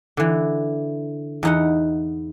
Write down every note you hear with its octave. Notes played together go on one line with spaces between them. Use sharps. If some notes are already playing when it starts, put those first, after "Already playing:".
D3 E3
E2 D#4 F#5